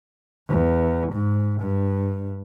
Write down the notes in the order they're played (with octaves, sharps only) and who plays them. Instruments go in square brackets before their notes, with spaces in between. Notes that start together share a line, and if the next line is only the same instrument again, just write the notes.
[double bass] E2
G#2
G2